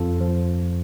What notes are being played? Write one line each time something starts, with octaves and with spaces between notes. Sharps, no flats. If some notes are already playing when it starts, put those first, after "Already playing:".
Already playing: F2 F4 A4
F3